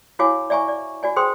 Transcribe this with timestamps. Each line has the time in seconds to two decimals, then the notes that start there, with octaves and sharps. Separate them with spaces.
0.19 E4 F#4 C#5 F5 G#5 D6
0.50 D5 E5 G#5 A#5 C#6
0.68 D5
1.03 F#4 D5 G#5
1.16 G#4 C5 G5 C6 D#6